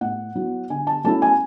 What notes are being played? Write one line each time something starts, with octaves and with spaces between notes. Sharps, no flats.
A2 F#5
F#3 B3 E4
D3 G#5
A5
F#3 A3 C#4 E4 A5
G#5